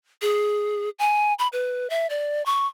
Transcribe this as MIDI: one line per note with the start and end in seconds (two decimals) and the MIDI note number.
0.22 0.90 68
0.99 1.34 80
1.39 1.48 83
1.53 1.88 71
1.90 2.07 76
2.10 2.44 74
2.46 2.66 85